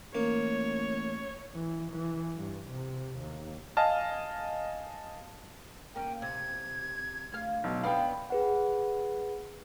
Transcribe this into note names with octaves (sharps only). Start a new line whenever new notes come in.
A1 A#3 C#5
E3
E3
G2
C3
D#2
D#5 F5 G#5 A5 F6
A#3 C#4 G5
C3 G#6
D2 F5
B1
B3 C4 D4 F5 G5 B5
G#4 B4 F#5